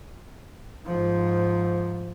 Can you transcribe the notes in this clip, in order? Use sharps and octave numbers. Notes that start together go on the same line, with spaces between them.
G#2 F3